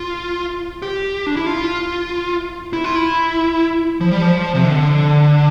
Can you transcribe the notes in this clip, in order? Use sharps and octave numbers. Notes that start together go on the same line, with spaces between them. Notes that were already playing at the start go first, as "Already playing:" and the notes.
Already playing: F4
G4
D4
E4
F4
E4
F4
E4
F3
G3
F3
C3
D3